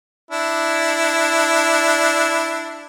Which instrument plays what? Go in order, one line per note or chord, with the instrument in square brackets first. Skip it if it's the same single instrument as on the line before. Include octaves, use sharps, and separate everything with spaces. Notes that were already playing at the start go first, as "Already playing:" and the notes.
[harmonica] D4 E4